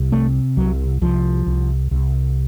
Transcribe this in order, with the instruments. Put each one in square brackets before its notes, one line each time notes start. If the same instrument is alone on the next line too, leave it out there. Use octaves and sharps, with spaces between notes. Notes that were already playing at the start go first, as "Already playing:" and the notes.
Already playing: [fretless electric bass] C2
C3 A3
C2 F#3
C2 F3
C2
C2